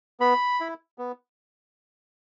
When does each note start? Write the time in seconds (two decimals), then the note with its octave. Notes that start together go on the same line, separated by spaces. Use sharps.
0.20 B3 B5
0.60 E4
0.98 B3